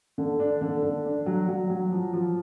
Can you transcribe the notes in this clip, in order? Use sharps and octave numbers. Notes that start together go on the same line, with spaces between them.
D3
D4
D3
D3
D4
F#3
F#3
F#3
F3
F3